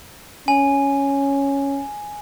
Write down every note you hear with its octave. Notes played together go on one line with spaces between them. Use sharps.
C#4 G#5